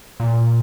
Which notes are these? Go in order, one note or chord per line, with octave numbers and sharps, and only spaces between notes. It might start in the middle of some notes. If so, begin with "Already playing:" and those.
A#2